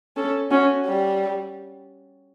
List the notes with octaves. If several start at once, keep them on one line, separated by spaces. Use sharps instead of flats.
C#4 A4
C#4 F#4
G3